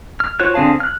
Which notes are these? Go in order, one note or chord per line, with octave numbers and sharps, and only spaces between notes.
F6
F4 F#4 C5 C#5 F#6
D3 C4 G#4 F5 A5
F6 F#6